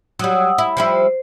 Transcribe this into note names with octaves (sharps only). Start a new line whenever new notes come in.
F#3 G3 F#5 D#6 E6
E4
F3 G3 E4 C5